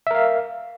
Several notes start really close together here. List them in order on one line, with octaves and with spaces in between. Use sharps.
E5 A#4 F5